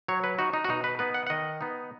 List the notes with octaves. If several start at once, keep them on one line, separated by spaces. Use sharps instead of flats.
F#3 C#5
B4
D#4 F#4
D#4
F#4
B2 D#4
B4
B3 D#4 B4
F#5
F#5
D#3 D#5
B3 D#4